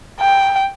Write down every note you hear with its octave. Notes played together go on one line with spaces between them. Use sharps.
G5